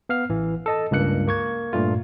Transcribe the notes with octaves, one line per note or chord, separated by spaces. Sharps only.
B3 F5 F6
A1 E3
A4 D#5 A5
C#2 G2 A#3 F#6 C#7
A#3 C#6 G#6
G2 A#2 A3 F4